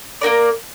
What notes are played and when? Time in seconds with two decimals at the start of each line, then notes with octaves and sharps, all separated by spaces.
0.21 A#3 D#4 A#4 D5